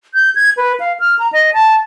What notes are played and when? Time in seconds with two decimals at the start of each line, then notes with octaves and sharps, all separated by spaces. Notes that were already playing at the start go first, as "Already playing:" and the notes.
0.14 G6
0.35 G#6
0.57 B4
0.80 F5
1.00 F6
1.19 A#5
1.33 D#5
1.53 A5